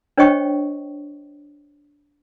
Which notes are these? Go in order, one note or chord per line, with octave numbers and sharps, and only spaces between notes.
D4 C5 C#5 D#5 G5 C#6